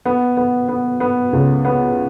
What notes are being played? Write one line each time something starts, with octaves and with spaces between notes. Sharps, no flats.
B3
B3
B3
B3
C#2
B3